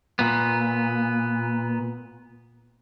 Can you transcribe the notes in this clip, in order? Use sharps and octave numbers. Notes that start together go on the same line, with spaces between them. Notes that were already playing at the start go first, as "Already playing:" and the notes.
A#2 B3